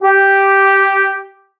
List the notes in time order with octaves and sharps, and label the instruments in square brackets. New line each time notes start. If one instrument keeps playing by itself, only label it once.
[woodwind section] G4